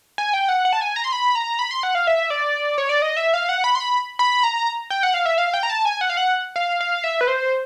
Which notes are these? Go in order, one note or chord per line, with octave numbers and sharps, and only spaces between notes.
G#5
G5
F#5
F#5
A5
G#5
A#5
C6
B5
A#5
B5
C6
F#5
F5
E5
D5
C#5
D5
D#5
E5
F5
F#5
B5
C6
B5
B5
A#5
G5
F#5
F5
E5
F5
G5
A#5
A5
G#5
F#5
F5
F#5
F5
F5
E5
B4
C5